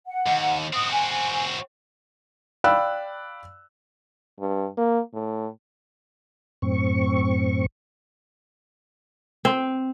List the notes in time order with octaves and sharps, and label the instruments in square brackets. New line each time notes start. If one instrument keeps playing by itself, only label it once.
[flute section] F#5
[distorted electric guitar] D#2
[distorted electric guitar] C4 F#4 [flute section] D#6
[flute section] G#5
[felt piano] D5 F5 G5 B5 E6 F#6
[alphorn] G2
A#3
A2
[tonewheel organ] F#2 A2 C4 C#6
[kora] C4